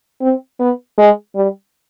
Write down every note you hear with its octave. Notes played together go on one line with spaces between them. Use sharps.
C4
B3
G#3
G3